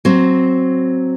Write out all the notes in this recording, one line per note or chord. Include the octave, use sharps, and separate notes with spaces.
F#3 C4